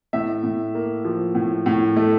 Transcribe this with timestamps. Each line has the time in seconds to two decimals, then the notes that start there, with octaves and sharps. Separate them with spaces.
0.13 A2 E5
0.44 A2
0.75 A#3
1.05 F3
1.35 A2
1.66 A2
1.97 A3